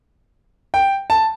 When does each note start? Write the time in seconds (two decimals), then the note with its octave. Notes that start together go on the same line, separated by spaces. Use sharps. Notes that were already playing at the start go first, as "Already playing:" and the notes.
0.74 G5
1.10 A5